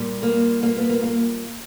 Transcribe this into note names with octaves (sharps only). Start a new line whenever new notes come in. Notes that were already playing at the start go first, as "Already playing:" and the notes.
Already playing: A#2 G3
A#3
A#3
B3
A#3
A#3